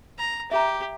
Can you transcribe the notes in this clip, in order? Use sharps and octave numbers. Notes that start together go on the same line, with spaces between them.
A#5
G4 E5 A#5